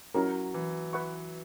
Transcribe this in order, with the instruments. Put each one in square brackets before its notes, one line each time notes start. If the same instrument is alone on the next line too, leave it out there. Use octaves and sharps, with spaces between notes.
[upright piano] F#3 [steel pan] C#4 E4 A#4
[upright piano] E3
[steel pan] B4 F#5 C#6